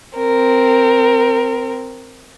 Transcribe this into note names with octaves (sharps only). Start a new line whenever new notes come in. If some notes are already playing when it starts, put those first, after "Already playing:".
C4 A#4